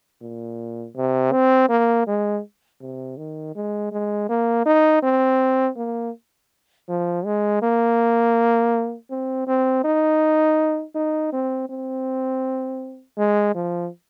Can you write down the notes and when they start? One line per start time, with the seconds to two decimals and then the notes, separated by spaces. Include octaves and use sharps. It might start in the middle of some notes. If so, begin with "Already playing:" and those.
0.21 A#2
0.95 C3
1.32 C4
1.69 A#3
2.07 G#3
2.81 C3
3.17 D#3
3.55 G#3
3.91 G#3
4.29 A#3
4.65 D#4
5.02 C4
5.77 A#3
6.88 F3
7.25 G#3
7.62 A#3
9.10 C4
9.47 C4
9.84 D#4
10.95 D#4
11.33 C4
11.69 C4
13.17 G#3
13.55 F3